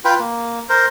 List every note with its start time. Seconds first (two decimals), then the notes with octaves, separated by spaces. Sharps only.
0.05 F4 B4 G5
0.19 A#3
0.69 A#4 C5